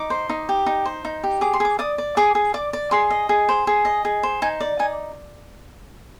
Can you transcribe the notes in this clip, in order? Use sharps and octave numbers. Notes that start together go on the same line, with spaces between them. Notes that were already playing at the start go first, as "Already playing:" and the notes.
Already playing: D#4 D6
C5
D#4
G4
D#4
C5
D#4
G4
G#4 D6
C6
G#4 D6
D5 D#6
D5
G#4 D6
G#4
D5 D6
D5
G#4 C6
D#5
G#4
C5
G#4
D#5
G#4
C5
D#4 G#5
D5
D#4 G#5